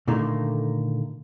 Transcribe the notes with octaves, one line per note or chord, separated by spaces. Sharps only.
A#2 D3 D#3 A3 A#3